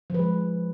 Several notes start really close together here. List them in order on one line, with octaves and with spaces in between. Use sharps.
F3 B4 G#3